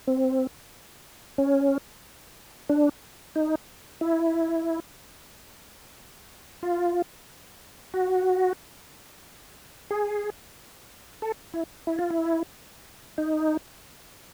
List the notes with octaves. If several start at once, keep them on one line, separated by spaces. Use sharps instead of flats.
C4
C#4
D4
D#4
E4
F4
F#4
G#4
A4
E4
E4
F4
E4
D#4